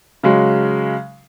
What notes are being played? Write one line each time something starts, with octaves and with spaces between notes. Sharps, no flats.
C#3 F#3 G#3